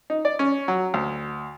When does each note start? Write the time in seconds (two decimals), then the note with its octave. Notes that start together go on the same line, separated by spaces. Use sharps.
0.10 D#4
0.25 D5
0.39 C#4
0.68 F#3
0.94 D2